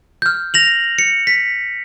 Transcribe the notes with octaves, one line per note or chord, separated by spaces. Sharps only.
F6 G6
A#6 F7 F#7
C#7
B6